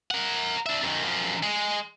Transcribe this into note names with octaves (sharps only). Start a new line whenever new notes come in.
A#4 F#5
D4 E5
F#2 D#3
F#2 F3
G#3